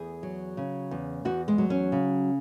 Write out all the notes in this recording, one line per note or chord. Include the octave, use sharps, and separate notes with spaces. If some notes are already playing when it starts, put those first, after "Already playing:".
Already playing: E2 G#4
F#3
C#3
E2
E2 F#4
G#3
F#3
C#4
C#3